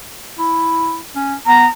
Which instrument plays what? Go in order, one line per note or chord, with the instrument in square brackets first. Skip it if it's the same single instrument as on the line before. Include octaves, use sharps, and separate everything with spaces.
[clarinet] E4
C#4
[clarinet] B3 [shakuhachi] A#5